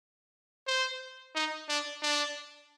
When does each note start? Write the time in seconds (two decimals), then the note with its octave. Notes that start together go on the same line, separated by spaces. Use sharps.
0.67 C5
1.35 D#4
1.69 D4
2.02 D4